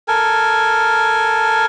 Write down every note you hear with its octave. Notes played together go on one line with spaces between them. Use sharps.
A4 A#4 G#5